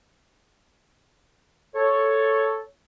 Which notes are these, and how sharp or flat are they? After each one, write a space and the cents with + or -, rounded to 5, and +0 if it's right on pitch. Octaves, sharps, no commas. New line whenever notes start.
A4 +0 C#5 +0